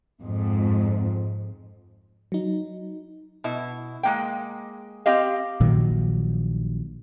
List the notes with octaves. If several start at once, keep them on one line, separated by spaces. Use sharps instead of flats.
F2 G#2
F#3 D#4
B2 E4
G#3 A#3 G5
C4 G4 D#5 F5
A#1 A#2 D#3 F#3